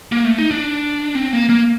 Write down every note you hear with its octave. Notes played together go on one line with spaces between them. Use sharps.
A#3
A3
D#4
D4
C4
A#3
A#3